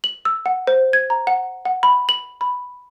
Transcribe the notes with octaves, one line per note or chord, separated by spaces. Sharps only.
F#7
E6
F#5
C5
G#6
A#5
F#5
F#5
B5
F#7
B5